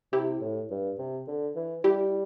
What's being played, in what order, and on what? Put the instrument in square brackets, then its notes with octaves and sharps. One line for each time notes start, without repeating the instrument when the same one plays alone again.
[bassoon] C3 [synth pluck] E4 G4
[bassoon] A2
G2
C3
D3
E3
[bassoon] G3 [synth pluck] E4 G4